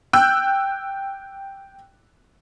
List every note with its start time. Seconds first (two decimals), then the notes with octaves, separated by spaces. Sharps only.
0.13 G5 E6 F#6 G6